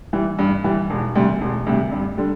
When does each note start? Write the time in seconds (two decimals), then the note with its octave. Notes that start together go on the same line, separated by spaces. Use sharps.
0.13 E3 G3
0.39 G2
0.64 E3 G3
0.90 E1
1.15 D2 C3 G3
1.41 E1
1.67 D2 C3 G3
1.92 G2
2.18 D3 G3